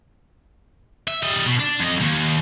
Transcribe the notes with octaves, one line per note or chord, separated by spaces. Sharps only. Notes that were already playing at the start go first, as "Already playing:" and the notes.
E5
G3 D#5
B2
D4
F2 D#5
D#2